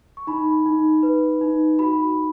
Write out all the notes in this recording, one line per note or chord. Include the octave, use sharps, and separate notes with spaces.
C#6
D#4 B5
D#4
B4
D#4
F#4 B5